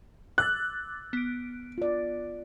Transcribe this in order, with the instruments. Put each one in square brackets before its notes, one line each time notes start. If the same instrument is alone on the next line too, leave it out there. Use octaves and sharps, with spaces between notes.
[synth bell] D6 E6 A6 [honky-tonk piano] F#6
[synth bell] B3 D7
[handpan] F4 D5